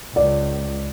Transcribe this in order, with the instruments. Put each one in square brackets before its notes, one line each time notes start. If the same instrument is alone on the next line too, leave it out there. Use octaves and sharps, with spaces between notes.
[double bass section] C#2 [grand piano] D5